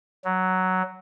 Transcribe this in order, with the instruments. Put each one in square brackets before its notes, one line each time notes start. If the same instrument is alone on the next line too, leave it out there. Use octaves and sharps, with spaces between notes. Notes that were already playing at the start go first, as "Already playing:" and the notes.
[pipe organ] F#3